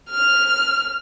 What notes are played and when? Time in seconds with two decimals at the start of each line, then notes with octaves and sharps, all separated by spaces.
0.10 F6